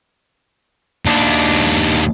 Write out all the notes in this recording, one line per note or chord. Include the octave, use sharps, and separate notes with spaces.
D#2 D4